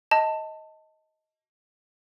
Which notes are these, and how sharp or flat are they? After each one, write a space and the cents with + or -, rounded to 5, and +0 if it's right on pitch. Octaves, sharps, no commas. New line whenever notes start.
D#5 +15 A5 +15